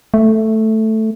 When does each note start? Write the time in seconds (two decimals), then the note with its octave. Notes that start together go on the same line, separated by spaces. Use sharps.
0.14 A3